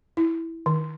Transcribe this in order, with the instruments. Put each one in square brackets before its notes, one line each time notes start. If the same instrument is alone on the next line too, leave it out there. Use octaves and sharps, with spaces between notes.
[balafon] E4
D#3